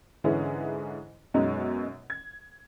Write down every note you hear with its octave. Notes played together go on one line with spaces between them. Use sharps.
G#2 D3 E3 C#4 E4 G#4
F#2 B2 G#3 C#4 D#4
G#6